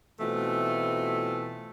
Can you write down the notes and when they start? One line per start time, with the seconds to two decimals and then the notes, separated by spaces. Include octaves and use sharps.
0.20 B2 E3 A3 C4 F4